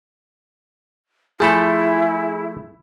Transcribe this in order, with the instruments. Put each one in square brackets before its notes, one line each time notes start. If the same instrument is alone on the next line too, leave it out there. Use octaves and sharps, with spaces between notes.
[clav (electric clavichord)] F3 A3 A4 [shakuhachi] E4 [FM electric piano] G#4 G#5 B5